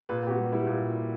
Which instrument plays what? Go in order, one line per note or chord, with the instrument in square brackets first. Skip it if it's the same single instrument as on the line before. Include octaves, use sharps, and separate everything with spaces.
[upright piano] A#2 B4
A#2 G4
F#4
G3
G3 E4
A#2